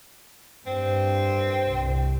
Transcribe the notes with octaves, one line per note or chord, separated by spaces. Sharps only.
G2 C4
C2